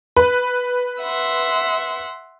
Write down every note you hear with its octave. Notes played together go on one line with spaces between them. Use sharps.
B4
E5 F#5 C6